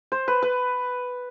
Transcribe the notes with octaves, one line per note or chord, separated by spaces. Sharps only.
C5
B4
B4